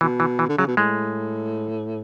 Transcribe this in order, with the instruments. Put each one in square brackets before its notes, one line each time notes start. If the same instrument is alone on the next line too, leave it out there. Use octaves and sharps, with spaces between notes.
[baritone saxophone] B2 [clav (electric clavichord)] E3
[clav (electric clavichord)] E3
E3
[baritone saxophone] D3
[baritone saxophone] C#3 [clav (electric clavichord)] F#3
[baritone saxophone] B2
[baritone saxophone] A2 [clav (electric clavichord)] G#3